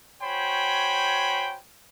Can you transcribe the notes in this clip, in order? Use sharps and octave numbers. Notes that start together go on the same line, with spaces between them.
F#4 C5 C#5 G5 G#5 B5